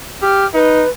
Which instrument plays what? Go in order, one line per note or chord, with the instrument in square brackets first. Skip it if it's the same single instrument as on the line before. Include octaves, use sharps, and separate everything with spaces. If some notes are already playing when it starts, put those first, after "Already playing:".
[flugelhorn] G4 [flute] F6
[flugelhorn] D#4 [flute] B4